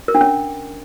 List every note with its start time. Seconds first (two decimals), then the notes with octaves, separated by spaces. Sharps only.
0.08 A#4
0.15 D4
0.21 C#4